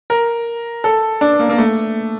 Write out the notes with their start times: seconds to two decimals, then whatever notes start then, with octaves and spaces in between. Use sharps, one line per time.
0.10 A#4
0.84 A4
1.21 D4
1.39 A#3
1.49 A#3
1.58 A3